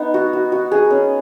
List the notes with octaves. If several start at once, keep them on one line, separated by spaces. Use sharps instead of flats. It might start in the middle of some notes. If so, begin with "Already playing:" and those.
Already playing: B3 D#4
F#4
F#4
F#4
G#4
C#4